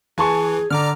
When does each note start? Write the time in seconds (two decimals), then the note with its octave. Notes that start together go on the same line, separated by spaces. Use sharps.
0.18 E3 G#4 G#5 A5 C#6
0.70 D3 D5 A#5 D6 F6